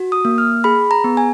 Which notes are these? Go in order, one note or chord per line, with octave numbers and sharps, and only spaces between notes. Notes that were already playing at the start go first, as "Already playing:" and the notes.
Already playing: F#4
D#6
A#3
F6
G#4 B5
A#5
B3
G#5